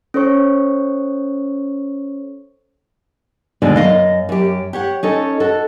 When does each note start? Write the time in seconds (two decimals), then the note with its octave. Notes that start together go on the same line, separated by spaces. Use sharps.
0.14 C#4 A4 C5 C#5 C#6
3.62 D#2 B2 D3 D#3 G#3
3.76 F#2 D#5 F5
4.29 F#2 G4
4.73 G4 C#5 F#5
5.03 C#4 D#4 A4
5.40 F#4 A4